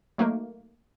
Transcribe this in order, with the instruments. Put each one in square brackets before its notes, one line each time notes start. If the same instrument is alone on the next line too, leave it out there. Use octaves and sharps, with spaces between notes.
[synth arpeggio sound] F#3 A3 A#3 D#4 A#4